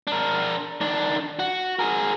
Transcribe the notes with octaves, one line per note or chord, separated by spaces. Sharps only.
D4 A#4
D#3 D4
F#4
G#4 A#4